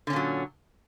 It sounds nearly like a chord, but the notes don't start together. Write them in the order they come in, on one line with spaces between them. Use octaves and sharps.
D3 C#4 A#2 F#3